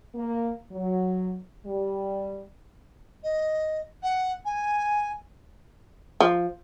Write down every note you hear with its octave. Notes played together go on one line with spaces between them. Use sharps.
A#3
F#3
G3
D#5
F#5
G#5
F3